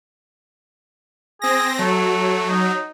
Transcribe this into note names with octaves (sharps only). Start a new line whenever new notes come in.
C4 G#4 A#6
F#3 A3
D#4